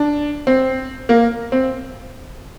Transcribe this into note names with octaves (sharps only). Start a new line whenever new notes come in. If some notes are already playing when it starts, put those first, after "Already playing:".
Already playing: D4
C4
A#3
C4